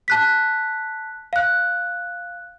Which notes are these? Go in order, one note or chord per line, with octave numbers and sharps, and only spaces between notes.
A5 F#6 B6
F5 F#6